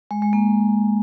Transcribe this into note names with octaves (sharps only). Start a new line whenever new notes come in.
G#3
G#3
A#3